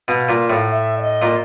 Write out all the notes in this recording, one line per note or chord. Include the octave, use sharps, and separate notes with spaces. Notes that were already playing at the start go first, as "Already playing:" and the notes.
B2 F5
A#2
A2
E5
D5
D#5
A#2